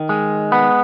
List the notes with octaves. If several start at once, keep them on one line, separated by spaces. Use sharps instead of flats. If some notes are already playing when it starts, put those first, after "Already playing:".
Already playing: D#3
G#3
B3